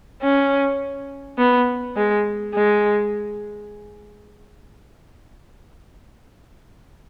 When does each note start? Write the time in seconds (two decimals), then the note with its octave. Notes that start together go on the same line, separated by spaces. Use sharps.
0.22 C#4
1.38 B3
1.96 G#3
2.54 G#3